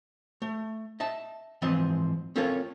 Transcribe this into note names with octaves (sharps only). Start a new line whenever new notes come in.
A3
D#5 E5 A5
G#2 E3 F3 C4 D#5
C4 C#4 F4 A4 A#4 C#5